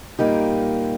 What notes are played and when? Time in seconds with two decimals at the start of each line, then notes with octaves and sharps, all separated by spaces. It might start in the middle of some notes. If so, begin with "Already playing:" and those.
0.19 A#2 G3 A#3 D#4 G4